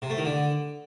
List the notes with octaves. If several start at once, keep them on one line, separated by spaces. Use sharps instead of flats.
C3
A3
D#3
D3